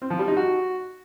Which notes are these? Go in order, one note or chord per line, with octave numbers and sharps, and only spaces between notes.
C4
F3
G3
D#4
F#4